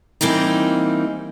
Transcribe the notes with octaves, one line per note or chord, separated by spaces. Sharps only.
E3 G3 A#3 C4 D#4